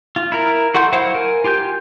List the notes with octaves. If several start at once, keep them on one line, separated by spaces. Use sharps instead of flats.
F4
E4 A#4
F#4 A4 F#5 C6 G6
F#3 E4 C5 F5 F#5
A#4 G#5
F4 G4 G#5 G6